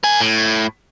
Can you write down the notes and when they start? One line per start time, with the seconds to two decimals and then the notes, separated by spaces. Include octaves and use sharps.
0.04 A#4 G#5
0.21 A2